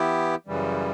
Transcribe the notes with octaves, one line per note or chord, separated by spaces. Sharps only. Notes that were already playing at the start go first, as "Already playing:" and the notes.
Already playing: E3 B3 E4 G4
F#2 C#3 E3 G3